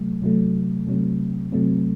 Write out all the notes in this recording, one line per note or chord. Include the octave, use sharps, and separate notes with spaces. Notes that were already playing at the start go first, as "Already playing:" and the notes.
Already playing: C3 F#3 A3
C3 F#3 A3
C3 F#3 A3 C4
C3 F#3 A3 C4